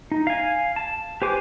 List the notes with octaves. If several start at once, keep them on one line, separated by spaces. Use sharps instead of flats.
D#4
F5 G#5
A5
G4 B4 C5 G#5 D6